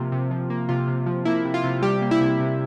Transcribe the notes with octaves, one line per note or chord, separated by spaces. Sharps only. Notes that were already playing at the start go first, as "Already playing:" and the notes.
Already playing: C3 F3 A#3 F4
C3
F3
A#3
C3 F4
C3
F3
A#3 E4
C3
F4
C3
G3 G4
A#3
E4
C3
C3